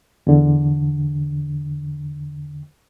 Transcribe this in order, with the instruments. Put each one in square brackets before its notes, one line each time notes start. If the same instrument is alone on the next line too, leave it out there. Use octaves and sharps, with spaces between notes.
[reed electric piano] E2 D3